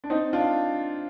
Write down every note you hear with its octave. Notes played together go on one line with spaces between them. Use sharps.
D4
C4 D#4
D4 F4